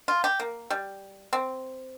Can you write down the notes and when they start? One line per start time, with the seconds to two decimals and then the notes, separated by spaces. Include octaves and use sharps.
0.08 F4
0.24 G4
0.40 A#3
0.70 G3
1.33 C4